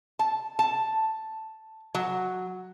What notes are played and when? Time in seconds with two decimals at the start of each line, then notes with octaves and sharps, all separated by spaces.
0.19 A5
0.59 A5
1.95 F#3